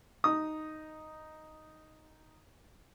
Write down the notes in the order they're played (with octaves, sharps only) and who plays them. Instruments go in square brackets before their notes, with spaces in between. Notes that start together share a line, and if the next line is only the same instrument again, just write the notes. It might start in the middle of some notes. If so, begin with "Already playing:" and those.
[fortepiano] D#4 D#6